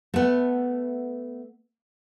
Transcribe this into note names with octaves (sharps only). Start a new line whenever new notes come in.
A3 B3